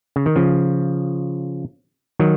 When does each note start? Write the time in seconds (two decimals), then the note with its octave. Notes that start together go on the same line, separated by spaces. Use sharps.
0.16 C#3
0.26 D#3
0.36 C#3 F3
2.19 D#3 F#3